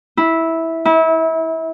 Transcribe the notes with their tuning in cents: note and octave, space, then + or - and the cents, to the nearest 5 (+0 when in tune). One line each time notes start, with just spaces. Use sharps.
E4 -10
E4 -30